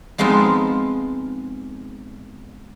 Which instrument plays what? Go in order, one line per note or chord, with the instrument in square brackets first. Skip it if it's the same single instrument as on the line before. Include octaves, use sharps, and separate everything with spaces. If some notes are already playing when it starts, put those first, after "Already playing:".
[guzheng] F3 G#3 B3 C4 D#4 F4